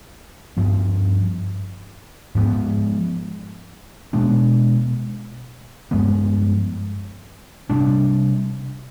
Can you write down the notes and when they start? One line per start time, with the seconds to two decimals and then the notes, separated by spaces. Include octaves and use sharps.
0.57 G2 F3 B3
2.35 G#2 F3 B3
4.13 B2 G#3 B3 D4
5.91 G2 F3 G#3 B3
7.70 C3 G3 D4